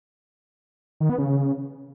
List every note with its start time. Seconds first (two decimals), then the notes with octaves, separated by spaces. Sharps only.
1.00 D#3
1.09 B3
1.18 C#3